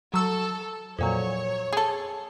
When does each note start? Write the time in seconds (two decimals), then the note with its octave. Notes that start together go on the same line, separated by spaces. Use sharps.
0.14 F#3 A4 E6
0.99 F2 A#2 F#3 C#5
1.73 G#4 A4